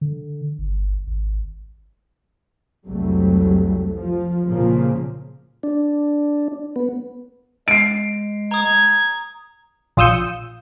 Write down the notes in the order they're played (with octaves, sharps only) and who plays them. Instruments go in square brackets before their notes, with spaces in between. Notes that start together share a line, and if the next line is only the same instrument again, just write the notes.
[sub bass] D3
G1
G#1
[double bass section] F1 C2 F#3 G3 A3
F3
C2 A#2 C#3 F3 A#3
[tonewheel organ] D4
B3
[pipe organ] G#3 [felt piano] C7 D7
[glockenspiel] A#5 D#6 [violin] G#6
[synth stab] A#1 F4 D#6 E6 G6 C#7